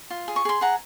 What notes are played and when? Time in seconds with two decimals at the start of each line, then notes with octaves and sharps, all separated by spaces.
0.10 F4
0.28 G#4
0.36 C#6
0.45 G#4 C6
0.61 G#4 F#5 A#5